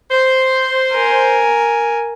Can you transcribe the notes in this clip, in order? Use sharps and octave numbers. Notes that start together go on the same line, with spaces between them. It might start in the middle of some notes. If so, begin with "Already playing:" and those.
C5
A#4 G#5